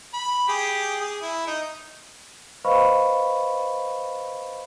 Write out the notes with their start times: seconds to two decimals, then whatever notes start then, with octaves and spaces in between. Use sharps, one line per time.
0.14 B5
0.49 G4 G#4
1.01 G#4
1.22 E4
1.47 D#4
2.64 B4 C5 D#5 F5 B5 C#6